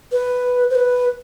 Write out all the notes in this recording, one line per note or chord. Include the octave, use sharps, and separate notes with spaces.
B4
C5
B4